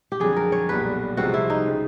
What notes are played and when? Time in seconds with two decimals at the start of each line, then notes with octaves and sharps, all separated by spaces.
0.12 G4
0.20 F2 D3 F#3 G#4
0.36 A#4
0.52 C#5
0.69 B1 A#2 G3 B3 B4
1.17 C2 C3 F3 G#3 C4 F#4
1.34 E4
1.50 D#4
1.66 C#3 F3